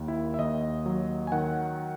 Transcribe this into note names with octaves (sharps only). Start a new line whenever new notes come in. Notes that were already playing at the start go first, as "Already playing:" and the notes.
Already playing: D#2 D#3
E4
E5
D#2 D#5
F#3
G#5
D#3 F#5